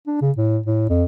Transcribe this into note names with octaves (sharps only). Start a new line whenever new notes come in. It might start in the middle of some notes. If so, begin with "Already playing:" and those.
D4
C#3
A2
A2
F2